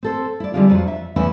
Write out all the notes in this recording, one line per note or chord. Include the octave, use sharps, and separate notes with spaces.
C4 A4 C5
E4 D5
D3 E3 G3 G#3 C4 F4
F2 F#3 F4
E5
E2 E3 A3 C#4 E4 F#5